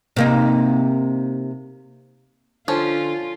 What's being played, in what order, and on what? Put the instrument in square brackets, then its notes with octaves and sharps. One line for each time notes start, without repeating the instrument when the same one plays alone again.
[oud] C3 A#3 D#4
[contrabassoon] D3 [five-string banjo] F3 C#4 [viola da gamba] F4